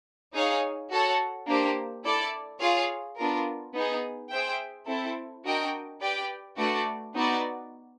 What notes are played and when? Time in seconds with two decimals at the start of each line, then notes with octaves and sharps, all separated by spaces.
0.34 D#4 G#4 C#5 F5 G#5
0.90 F#4 A4 C#5 F#5
1.47 A#3 D4 G4 C5
2.04 E4 A4 D5
2.60 F4 G#4 C#5 F5
3.17 B3 D4 F4 A#4
3.74 B3 D#4 G#4
4.31 G#4 C5 E5 G5
4.87 C4 E4 A4
5.44 D4 F#4 A#4 D#5 G5
6.01 G4 B4 D5 G5
6.57 A3 D4 F#4 B4 D5
7.15 B3 D#4 F#4 B4 D5